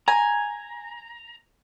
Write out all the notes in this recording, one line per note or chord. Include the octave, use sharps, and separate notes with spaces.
G#5 A#5